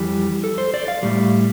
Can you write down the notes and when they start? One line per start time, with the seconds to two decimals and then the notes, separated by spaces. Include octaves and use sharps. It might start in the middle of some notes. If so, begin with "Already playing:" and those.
Already playing: F2 E3 G3 G4
0.44 A4
0.58 C5
0.74 D5
0.88 F5
1.03 A2 G3